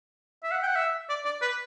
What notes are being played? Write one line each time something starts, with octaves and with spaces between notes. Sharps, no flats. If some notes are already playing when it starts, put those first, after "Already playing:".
E5
F#5
G5
F#5
E5
D5
D5
B4